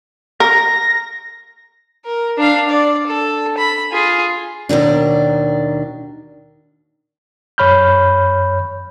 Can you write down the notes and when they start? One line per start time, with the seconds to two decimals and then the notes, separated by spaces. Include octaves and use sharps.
0.40 A#4 A#6
2.06 A#4
2.38 D4 F5
2.70 D5
3.07 A4
3.58 B5
3.92 F4 G#4
4.69 D#2 B2 D#3 D4
7.58 F#2 C#5 B5 F6 G6